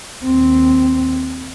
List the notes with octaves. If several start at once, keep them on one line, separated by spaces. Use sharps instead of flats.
D#2 C4